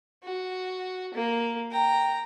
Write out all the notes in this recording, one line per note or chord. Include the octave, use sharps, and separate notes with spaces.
F#4
A#3
G5 A#5